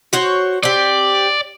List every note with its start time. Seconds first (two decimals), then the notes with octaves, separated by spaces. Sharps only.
0.13 F#4 C5 C#5
0.63 C4 G4 D5